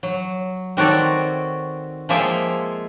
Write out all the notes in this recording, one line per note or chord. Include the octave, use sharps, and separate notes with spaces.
F#3
D#3 C4 F#4 A4 C#5 D5
F3 G#3 A#3 G#4 E5 G5